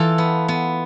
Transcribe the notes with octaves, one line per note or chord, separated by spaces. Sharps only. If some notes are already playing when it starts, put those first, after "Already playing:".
Already playing: E3 F4 A4
B3
B3